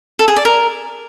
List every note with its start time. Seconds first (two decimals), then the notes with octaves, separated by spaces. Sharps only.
0.19 A4
0.28 G#4
0.36 D5
0.45 A#4